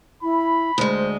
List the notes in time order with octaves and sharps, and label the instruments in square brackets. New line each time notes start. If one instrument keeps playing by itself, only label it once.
[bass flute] E4 [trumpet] B5
[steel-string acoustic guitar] D2 G#3 [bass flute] C5